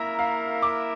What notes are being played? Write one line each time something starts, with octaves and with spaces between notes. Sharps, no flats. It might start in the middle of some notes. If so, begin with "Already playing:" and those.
Already playing: A#3 E4 A#4 E5 A#5
F5
D6